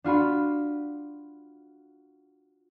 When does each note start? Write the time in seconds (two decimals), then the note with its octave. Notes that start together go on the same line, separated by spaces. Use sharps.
0.04 D4 F4 F#4 B5